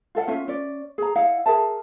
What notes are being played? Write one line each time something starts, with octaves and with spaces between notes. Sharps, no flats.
F4 A4 F5 F#5
C#4 F4 E5
C#4 D5
G#4 A#5
E4 D#5 F5 F#5
G#4 A#4 E5 A5